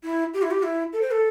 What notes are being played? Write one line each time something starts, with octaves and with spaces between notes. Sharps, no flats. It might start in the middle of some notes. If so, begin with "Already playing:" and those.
E4
G4
E4
G4
E4
A4
C5
A4